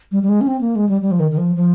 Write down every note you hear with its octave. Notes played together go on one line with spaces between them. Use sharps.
G3
G3
G#3
C#4
C4
A#3
G#3
G3
G3
F3
D#3
D#3
F3
F3